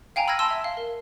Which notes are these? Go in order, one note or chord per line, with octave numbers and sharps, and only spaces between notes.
F5 G5 G#5 A#5
B5 E6 F6 G#6 A#6 D#7
A5 C6 E6
E5
F5
A#4